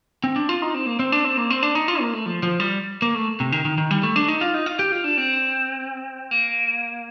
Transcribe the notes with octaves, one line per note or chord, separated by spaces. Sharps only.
C4
D4
F4
D#4
C4
A#3
C4
D4
C4
A#3
C4
D4
D#4
F4
A#3
A3
F3
F3
G3
A#3
A3
C3
D#3
D#3
D#3
G3
A3
D4
D#4
F4
D#4
F4
G4
F4
D4
C4
A#3